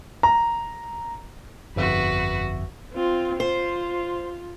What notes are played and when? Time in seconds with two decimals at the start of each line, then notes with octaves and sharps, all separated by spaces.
0.23 A#5
1.76 G1 F2 F#4 B4 E5
2.93 C4 F4
3.40 F4 C5